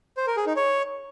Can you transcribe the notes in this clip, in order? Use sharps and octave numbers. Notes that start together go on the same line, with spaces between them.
C5
A#4
G#4
D#4
C#5